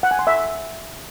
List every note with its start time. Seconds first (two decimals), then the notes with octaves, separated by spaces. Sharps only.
0.03 F#5
0.11 G#5
0.19 C6
0.27 E5